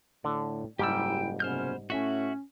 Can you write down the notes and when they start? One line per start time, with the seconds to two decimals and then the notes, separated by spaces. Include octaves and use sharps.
0.24 A2 D3 D5
0.79 F#1 G#2 G3 E4 G4 G5 E6
1.40 F#1 C3 B3 C#4 C5 F6 G6
1.90 A2 C#4 F#4 E5